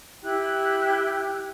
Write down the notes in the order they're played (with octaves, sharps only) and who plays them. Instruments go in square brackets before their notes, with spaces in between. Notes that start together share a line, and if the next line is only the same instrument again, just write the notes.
[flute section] E4 G4 G5 F#6